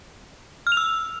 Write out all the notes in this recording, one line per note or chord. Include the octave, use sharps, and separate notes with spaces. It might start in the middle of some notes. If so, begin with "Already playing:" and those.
F6
F7
E6